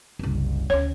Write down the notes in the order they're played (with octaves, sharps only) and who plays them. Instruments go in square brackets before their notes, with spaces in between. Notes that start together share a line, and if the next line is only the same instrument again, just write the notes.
[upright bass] F#1 C2
[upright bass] D2 C#4 [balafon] C#5